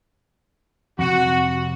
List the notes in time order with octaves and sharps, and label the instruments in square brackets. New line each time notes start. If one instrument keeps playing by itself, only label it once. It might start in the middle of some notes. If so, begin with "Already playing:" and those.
[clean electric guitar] F2 C3 [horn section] F#4